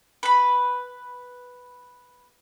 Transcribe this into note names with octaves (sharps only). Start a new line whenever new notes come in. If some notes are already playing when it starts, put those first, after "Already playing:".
B4 B5